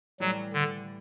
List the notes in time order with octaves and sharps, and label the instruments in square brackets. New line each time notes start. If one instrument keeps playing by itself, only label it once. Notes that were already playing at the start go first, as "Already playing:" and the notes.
[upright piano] A2 E3 G3 [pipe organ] F#3
[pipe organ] D3